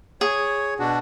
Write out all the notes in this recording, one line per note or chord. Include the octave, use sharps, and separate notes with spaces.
G#4 C#5
B2 D4 F#4